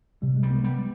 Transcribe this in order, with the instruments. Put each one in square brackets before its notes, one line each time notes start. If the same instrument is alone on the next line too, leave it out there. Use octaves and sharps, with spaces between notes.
[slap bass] C3 [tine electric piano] G3
[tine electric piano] G#3
[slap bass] G3
[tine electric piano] B3
[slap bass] G3 [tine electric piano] B3